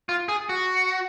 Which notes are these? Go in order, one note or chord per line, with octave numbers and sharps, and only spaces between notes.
F4
G#4
F#4